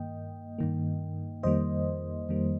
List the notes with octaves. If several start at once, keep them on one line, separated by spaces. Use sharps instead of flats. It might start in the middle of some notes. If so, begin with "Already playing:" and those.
Already playing: G2 D#3 A#3 D#5 G5
G2 D#3 A#3
F2 D#3 G3 A#3 C5 D#5
F2 D#3 G3 A#3